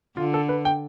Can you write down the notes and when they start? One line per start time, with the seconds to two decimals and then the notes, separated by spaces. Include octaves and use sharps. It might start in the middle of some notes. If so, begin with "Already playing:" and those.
0.17 D3 F4
0.34 A4
0.49 B4
0.65 G5